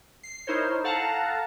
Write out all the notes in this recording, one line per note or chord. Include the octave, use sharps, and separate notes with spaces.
C7
D#4 E4 A#4 C5 C#5
A4 F5 F#5 A5 A#5